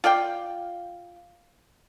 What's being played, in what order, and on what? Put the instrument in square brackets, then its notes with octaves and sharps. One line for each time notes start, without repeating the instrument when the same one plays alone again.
[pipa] F4 D5 F5 G5